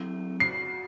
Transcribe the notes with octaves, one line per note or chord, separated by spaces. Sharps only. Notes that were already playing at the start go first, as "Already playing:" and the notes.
Already playing: F#3 A3 C4 E4
F#4 C7